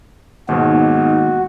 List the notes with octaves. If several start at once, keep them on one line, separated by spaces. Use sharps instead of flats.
D#2 G#2 B2 G#3 D#4 F#4